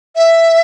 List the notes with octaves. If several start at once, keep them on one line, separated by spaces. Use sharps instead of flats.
E5